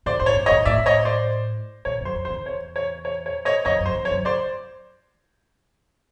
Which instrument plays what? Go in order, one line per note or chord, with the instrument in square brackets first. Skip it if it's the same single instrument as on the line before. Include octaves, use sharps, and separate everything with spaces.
[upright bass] A2 [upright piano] C5 D5
[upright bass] G#2 [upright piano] C5
[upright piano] C#5
[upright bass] G2
[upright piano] C#5 D#5
[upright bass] G#2
[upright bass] A2 [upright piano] D5 E5
[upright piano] C#5 D#5
C5 D5
[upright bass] A#2 [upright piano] C#5
[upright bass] F#2 [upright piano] C5
[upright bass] F2
[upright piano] C5
[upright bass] E2
[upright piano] C#5
C#5
C#5
C#5
C#5 D#5
[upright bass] F2 [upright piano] C#5 D#5
[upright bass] F#2
[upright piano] C5
[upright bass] F2
[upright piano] C#5
[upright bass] F#2
[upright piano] C5 D5